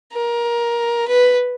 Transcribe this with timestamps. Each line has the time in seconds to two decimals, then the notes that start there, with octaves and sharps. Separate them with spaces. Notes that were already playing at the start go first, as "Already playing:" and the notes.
0.13 A#4
1.08 B4